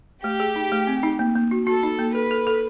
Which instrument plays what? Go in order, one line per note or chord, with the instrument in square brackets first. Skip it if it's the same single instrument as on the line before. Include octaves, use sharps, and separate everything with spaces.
[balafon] A3 [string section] G4
[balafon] G#4
D#4
A3
C4
D#4
A#3
A#3
F#4
[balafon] F#4 [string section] A4
[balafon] D#4
A#3
[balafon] A4 [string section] B4
[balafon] A4
A4